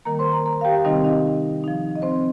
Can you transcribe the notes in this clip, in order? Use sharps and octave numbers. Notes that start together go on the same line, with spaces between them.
D#3 G3 A#3 A#4 A#5
C5 C6
A#4 A#5
A#4 A#5
F5
G4 G5
C3 D#3 G3 C4 D#4 D#5
D#4 D#5
F3 D#4
D#5
C4 C5